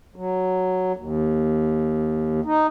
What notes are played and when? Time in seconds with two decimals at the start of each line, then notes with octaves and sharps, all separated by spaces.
0.16 F#3
0.97 D#2
2.45 D#4